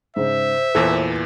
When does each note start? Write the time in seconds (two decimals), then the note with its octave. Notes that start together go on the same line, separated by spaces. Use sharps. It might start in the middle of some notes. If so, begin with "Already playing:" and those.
0.16 G#2 C#3 C5 E5
0.75 E2 A#2 E3 A4